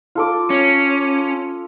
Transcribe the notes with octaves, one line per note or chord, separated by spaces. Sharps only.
F4 A4 D6
C#4